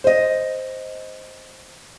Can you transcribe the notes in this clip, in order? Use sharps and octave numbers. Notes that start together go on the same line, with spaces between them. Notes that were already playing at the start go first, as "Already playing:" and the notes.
C5 D#5